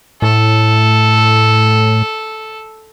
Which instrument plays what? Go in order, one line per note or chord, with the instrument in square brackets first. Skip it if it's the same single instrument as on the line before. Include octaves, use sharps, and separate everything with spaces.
[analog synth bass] A2 [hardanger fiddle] A4